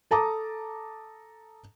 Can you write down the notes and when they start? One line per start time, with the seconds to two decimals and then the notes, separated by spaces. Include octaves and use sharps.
0.11 A4 A5 A#5 D6 D#6